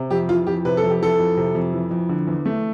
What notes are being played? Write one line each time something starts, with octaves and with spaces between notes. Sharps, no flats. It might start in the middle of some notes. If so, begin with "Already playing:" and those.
Already playing: C3
F2 G4
E3 F4
F2 G4
C3 B4
A4
F2
G4
E3 A4
F2
C3
F2
E3
F2
D3
E2
A3